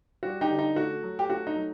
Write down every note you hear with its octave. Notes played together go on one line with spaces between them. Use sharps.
G3 F#4
D#4 G4
D3
D#4
A3 F#4
F#3
G4
A3 F#4
D#4
F#3